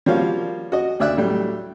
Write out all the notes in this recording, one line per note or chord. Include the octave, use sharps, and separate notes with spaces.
F3 G3 A#3 F#4 C#5 F5
F#4 D#5
D2 D5 E5 E6 F#6
A2 F#3 G3